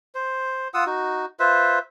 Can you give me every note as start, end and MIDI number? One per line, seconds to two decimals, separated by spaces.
0.15 0.68 72
0.74 0.84 65
0.74 0.84 78
0.74 0.84 87
0.74 0.84 88
0.86 1.26 63
0.86 1.26 66
1.40 1.79 65
1.40 1.79 71
1.40 1.79 72
1.40 1.79 76